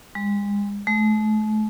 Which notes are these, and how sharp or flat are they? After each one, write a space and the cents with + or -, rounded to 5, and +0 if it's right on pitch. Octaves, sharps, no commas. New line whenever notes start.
G#3 -40
A3 -40